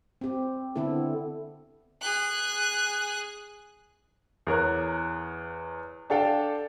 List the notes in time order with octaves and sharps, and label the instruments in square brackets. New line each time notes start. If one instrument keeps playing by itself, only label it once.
[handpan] C4 G4
D3 B3 C4 E4 A4
[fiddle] G#4 F#6
[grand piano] E2 A#4 C#5 F#6
D4 G4 A4 F5 G5